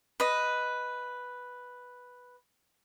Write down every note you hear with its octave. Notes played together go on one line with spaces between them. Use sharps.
B4 D#5